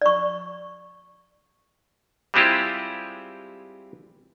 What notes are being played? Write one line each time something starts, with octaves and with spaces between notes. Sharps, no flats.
D5 C#6
G3 G#3 C4 E4 F4 G4